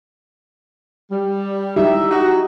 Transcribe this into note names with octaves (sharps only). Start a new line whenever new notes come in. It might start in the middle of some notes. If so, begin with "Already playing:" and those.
G3
G3 D#4 E4 G4 E5
D#4 F#4